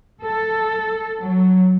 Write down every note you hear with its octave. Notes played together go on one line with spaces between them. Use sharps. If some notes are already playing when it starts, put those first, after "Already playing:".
A4
F#3